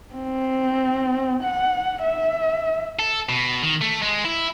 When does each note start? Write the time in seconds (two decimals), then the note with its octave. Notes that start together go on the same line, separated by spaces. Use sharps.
0.14 C4
1.43 F#5
2.03 E5
2.99 A4
3.29 B2
3.62 D#3
3.81 A3
4.02 G#3
4.25 E4